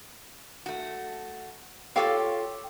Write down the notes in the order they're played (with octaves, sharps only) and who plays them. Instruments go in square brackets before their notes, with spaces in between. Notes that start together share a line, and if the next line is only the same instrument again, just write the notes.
[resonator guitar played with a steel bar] A3 F#4
[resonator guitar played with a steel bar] F4 A4 F5 [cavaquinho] G4 C#5 D6